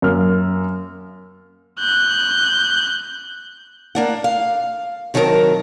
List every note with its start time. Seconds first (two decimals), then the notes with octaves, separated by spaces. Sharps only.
0.02 F#2 A#3 F6
1.80 F#6 G6
3.95 A#3 D4 F#5
4.24 F5
5.14 C3 D#3 F#3 G#4 A#4 A5